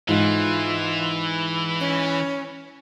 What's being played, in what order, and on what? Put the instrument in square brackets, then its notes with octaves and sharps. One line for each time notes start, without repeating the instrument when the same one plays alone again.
[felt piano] G#2 [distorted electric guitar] E3 [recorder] F4
[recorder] C#4